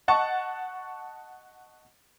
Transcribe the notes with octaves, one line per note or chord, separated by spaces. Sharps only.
D#5 F#5 A5 C#6